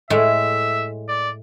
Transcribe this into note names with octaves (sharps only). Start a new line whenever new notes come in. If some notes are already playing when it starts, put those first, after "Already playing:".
A2 G#3 E4 E5
D5